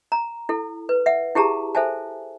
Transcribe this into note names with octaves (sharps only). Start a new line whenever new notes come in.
A#5
E4 A4
B4
E5 F#5
E4 G4 G#4 A5 A#5
A4 C5 E5 G#5 A5